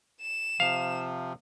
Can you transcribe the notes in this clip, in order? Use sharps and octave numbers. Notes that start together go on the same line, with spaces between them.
E7
C3 F3 F5